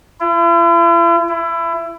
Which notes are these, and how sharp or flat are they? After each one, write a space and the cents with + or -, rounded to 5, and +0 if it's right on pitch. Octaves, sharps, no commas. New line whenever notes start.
E4 +45
E4 +25